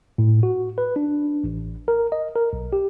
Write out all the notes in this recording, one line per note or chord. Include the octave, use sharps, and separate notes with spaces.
A2
F#4
B4
D4
A1
A#4
D#5
A#4
B1
G4